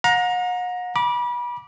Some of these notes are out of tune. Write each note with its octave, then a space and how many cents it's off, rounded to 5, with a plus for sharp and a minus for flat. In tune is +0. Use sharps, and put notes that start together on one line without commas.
F#5 -40 A#5 +15
B5 -30 D6 +0